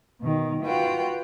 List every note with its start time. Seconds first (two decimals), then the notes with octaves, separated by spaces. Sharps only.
0.20 B2 D#3
0.63 F4 F#4 B4 F#5 G5